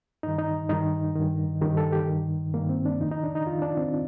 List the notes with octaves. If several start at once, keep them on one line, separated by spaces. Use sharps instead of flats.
G2 D#3 D#4
D#4
G2 D#3 D#4
G2 D#3
G2 D#3 G4
A4
G4
G2 D#3
G2 D#3 A#3
C4
D4
F2 D#3 D#4
D#4
D4
D#4
F2 D#3 F4
D4
C4